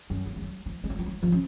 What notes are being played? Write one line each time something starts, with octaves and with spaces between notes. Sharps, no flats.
F#2
F3
G#3
F#3
F3
G#3
F#3
F3
F#3
F3
C#3